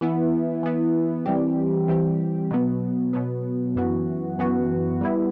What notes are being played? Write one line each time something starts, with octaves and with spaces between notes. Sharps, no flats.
E3 B3 E4
E3 B3 E4
E3 G3 C4 G4
E3 G3 C4 G4
B2 F#3 B3
B2 F#3 B3
F#2 E3 B3 F#4
F#2 E3 B3 F#4
G3 B3 E4